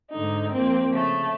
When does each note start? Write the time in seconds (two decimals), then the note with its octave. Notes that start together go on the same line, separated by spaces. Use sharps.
0.11 G#2 D3 D#4
0.52 F2 A#3 C4
0.92 C#3 A3